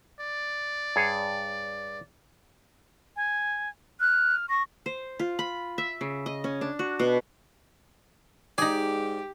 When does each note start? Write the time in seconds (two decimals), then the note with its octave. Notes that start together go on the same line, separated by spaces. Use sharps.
0.20 D5
0.96 G2 G#4 C#5
3.16 G#5
4.00 F6 F#6
4.49 C#6 A#6
4.86 C5
5.19 F4
5.39 B5
5.78 E5
6.01 C#3
6.26 D#5
6.44 C#4
6.61 D4
6.79 F#4
6.99 B2
8.58 G#2 D#4 G4 G#4 D5